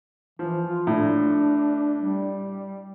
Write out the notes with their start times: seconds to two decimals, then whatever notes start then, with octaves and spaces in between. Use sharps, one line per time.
0.39 E3 F3
0.68 F4
0.87 A2 D4
2.01 G3